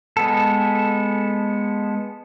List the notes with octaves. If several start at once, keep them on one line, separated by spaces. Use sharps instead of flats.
G#3 B3 A4